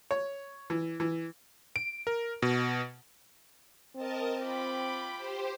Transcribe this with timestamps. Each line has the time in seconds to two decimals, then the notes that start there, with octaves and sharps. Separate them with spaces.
0.11 C#5
0.70 E3
1.00 E3
1.76 D7
2.07 A#4
2.42 B2
3.96 C4 A#4 D#5 A5
4.41 F4 G5 B5 D6
5.17 G4 C5